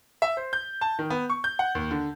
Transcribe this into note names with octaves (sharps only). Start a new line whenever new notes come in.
E5
C5
G6
A5
D#3
B3
C#6
G6
F#5
D#2
D3